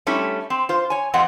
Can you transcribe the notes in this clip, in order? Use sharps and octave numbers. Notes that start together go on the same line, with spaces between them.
G3 A3 C#4 E4
C4
F4 C5
C#5 G#5
F2 C4 D#5 F#5